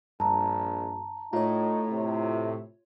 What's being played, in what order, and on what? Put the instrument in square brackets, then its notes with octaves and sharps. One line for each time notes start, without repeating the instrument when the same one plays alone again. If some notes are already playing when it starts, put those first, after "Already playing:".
[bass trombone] A#1 [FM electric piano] G2 [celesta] A5 A#5
[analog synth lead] A2 [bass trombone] D#4 [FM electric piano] F4 C#5 [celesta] A#5
[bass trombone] C3